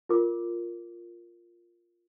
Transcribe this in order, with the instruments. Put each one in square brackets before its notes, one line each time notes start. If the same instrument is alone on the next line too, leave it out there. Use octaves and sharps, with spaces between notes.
[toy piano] F4 A#4 D6